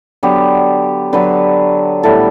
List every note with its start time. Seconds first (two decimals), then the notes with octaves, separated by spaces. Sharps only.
0.23 D3 F#3 B3 G4
1.13 D3 F#3 B3 B4
2.03 A2 G3 B3 A4